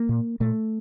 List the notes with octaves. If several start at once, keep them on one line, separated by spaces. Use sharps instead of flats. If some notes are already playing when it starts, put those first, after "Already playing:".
Already playing: A#3
A#2
A#2 A3